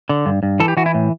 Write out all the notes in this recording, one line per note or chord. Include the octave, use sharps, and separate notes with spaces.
D3
G2
G2
E3 A4
G4
E3 F#4
E4
A2